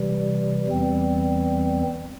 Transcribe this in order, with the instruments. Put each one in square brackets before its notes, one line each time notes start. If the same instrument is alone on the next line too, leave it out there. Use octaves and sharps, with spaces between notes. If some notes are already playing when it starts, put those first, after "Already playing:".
Already playing: [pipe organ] C3 E3 G3
E2 E3 G3 C4